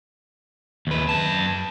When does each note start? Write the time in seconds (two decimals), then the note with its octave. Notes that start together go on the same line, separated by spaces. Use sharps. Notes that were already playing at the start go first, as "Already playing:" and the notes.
0.87 D#2 B4
1.09 F#2 A5